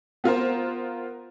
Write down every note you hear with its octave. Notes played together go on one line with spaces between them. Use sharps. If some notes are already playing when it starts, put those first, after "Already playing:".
B3 F4 A#4 C5